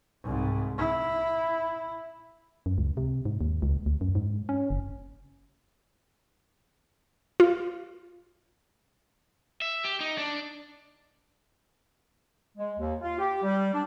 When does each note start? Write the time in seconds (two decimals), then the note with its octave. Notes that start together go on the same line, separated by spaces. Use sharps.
0.23 C2 G#2
0.78 E4
2.66 F#2
2.78 C#2
2.97 C3
3.25 G#2
3.41 D#2
3.62 C#2
3.86 D2
4.01 F#2
4.15 G#2
4.49 C#4
4.70 F#1
7.40 F4
9.62 E5
9.85 G4
10.00 D#4
10.18 D4
12.57 G#3
12.78 D#2
13.01 F4
13.19 G4
13.43 G3
13.73 D4